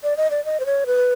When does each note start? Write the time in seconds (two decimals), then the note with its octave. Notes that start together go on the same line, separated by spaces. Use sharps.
0.04 D5
0.17 D#5
0.31 D5
0.45 D#5
0.60 C5
0.66 C#5
0.86 B4